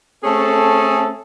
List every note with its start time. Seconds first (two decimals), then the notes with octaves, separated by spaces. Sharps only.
0.23 A3 C4 C#4 G#4 A4